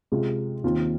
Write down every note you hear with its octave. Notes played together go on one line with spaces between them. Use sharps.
C3 G#3 F4
D#2 D#3 C4 F4